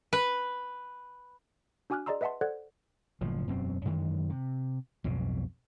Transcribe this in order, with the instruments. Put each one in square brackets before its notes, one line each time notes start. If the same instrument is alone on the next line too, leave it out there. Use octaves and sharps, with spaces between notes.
[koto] B4
[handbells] D4 F#4 G#5 D6 F6 F#6
G#4 D5 D#5 A#5 C6 E6
B4 D#5 E5 F#5 A5 C6
A4 C5 D5 F#5 F#6 G#6
[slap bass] F#1 A2 F3
E1 F#2 B2 C4
F#2 D#3 E3 G#3
C3
B1 F2 G#2 B2